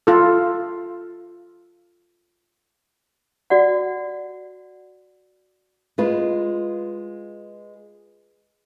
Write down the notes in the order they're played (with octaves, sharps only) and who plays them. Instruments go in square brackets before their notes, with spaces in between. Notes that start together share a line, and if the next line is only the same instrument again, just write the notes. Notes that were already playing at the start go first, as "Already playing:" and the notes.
[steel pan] F4 A4
[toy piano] F#4 D5 F#5
[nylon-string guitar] G#3 F4 B4